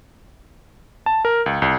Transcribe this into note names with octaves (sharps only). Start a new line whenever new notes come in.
A5
A#4
C#2
C2